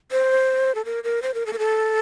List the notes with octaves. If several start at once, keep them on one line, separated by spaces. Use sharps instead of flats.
C5
A4
A#4
A#4
C5
A#4
A4
A#4
A4